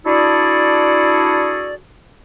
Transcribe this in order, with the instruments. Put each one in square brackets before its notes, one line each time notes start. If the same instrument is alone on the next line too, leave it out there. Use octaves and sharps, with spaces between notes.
[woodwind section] D4 E4 F#4 G#4 A4 D5